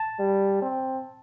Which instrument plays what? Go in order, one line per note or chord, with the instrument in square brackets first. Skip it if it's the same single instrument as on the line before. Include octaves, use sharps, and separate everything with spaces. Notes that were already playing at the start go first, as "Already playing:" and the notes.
Already playing: [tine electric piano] A5
[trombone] G3
C4